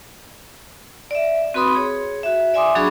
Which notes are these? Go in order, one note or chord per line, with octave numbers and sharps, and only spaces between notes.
D5 E5
C4 F#4 B4 B5 C6 D#6
G#4 C#5
F#4 E5
D5 E5 G#5 C6 D6 D#6
F#3 D4 F#4 G#4 B5 C#6